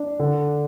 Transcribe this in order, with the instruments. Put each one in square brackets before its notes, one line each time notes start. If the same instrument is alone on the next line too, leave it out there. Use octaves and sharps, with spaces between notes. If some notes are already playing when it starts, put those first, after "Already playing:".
Already playing: [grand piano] D4
D3